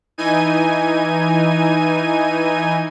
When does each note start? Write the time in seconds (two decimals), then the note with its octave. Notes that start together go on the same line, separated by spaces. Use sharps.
0.18 E3 D#4 G#5 G#6 D#7